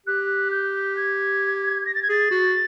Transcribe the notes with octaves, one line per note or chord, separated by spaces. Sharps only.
G4 F#6
G6
G#6
A#6
A6
G#6
G#4 A6
F#4